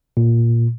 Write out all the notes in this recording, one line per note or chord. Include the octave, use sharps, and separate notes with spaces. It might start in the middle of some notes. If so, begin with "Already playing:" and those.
A#2